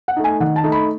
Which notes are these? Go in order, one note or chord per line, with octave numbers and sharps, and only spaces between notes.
F#5
A3 D#4
G#5
D#3 F#5
A5
A3 D#4
B5